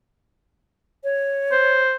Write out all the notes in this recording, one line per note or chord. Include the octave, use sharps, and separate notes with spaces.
C#5
C5